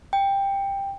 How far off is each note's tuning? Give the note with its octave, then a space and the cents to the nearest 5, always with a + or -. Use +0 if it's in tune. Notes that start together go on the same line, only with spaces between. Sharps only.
G5 +10